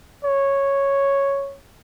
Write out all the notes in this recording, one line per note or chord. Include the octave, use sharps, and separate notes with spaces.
C#5